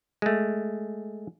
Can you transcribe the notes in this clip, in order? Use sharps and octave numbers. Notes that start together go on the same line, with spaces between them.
G#3 A3